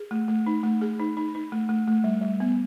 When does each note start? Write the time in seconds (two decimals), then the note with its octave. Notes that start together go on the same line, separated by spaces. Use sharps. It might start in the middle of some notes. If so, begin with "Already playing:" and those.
Already playing: G#4
0.11 A3
0.28 A3
0.46 D#4
0.63 A3
0.81 G#4
1.00 D#4
1.17 D#4
1.35 D#4
1.52 A3
1.69 A3
1.88 A3
2.04 G3
2.22 G3
2.40 B3